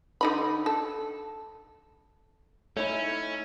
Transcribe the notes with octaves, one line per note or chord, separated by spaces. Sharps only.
D3 D#4 B5
A4
A3 C#4 D#4 E4 C#5